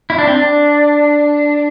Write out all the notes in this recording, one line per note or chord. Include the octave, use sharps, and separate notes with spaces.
E4
D4
C4
D4